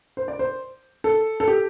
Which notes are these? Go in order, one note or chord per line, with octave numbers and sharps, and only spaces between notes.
C5
D5
C5
A4
A4
G4